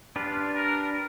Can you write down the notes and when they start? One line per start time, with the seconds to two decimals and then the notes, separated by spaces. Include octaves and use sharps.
0.16 D4 F4 G4 B4
0.55 A#4